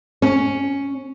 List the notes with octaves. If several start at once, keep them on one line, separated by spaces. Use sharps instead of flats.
C#4